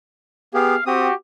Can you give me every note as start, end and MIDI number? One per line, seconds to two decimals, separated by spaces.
0.54 0.75 59
0.54 0.75 67
0.54 0.75 68
0.54 0.83 77
0.86 1.08 60
0.86 1.13 66
0.86 1.13 67
0.86 1.08 87